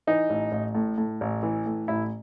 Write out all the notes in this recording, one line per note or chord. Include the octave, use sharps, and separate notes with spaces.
E3 D#4
A1
A1
A2
A2
A1
E3
A2
A1 E4